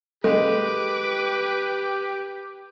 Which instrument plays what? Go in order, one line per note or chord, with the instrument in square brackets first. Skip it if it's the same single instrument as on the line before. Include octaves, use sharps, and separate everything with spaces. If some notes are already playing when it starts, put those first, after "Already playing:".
[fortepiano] G#3 [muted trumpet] G4 [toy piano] A4 [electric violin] B4 D6